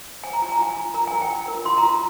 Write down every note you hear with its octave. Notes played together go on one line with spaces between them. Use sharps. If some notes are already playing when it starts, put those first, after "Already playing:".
C5 G#5
A#5
F4 G#5
A#5
F4 G#5
F4
A#4 A#5
G#5
A#4 A#5
G5
F4
A#4
F4 C6
A#5
F4
A#5